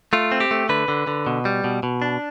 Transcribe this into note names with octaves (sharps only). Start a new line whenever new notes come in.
A3 F4
C4
G4
A3
D3 B4
D3
D3
B2
G3
B2
B2
D4